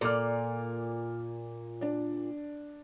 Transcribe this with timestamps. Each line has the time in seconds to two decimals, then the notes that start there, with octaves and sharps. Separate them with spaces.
0.01 A#2 A4 D6 F6
1.81 D4 D5